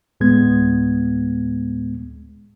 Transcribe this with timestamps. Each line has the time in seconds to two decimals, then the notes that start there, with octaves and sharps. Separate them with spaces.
0.20 D2 A2 G#3 B3 G#6